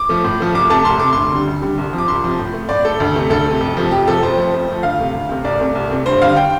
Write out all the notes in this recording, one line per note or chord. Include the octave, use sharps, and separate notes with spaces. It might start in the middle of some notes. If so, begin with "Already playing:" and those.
Already playing: D6
F3 A3
A2
F3 A3
C2 D6
C3 A3 A5
C2 C6
C3 A3 D6
D2 C6
D3 G3
D2
D3 G3
C2
C3 F3
D6
C2 C6
C3 F3
A2
A3
A2 D5
A3 A4
D2
C3 A3
D2 A4
C3 A3
F2
C3 F3 A3
F2 G4
C3 F3 A3 A4
F2 C5
F3 A3
F2
F3 A3
D2 F5
C3 A3
D2
C3 A3
C2 D5
C3 A3
C2
C3 A3
G2 C5
D3 G3 F5
G5